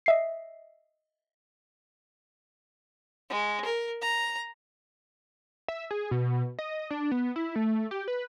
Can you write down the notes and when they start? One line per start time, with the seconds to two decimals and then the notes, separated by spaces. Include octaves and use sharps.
0.06 D#5 E5 C7
3.30 G#3
3.65 A#4
4.02 A#5
5.68 E5
5.91 G#4
6.11 B2
6.59 D#5
6.91 D4
7.11 B3
7.36 E4
7.56 A3
7.91 G4
8.08 B4